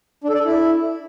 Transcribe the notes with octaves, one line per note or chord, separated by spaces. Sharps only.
D4
A4
D5
A4
E4